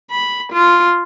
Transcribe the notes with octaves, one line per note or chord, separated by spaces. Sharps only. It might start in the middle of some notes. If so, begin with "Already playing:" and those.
B5
F4